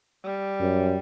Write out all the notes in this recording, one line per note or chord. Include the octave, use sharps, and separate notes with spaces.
G3
F#2